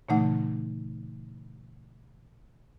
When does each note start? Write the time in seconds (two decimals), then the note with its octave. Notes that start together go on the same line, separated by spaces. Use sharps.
0.09 A#2 C#3 E3 A3 D#4 F#5